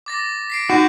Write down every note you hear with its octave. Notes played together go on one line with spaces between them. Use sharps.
D6 A6 A#6
B6 C7 D7
D#4 F#4 C#6 F#6 G6